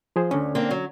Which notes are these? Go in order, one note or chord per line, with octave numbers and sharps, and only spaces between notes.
F3 G#4 C5
D2 D3 C#4
A#3 C4 D4
F#3